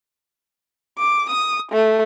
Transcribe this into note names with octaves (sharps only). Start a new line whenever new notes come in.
D6
D#6
A3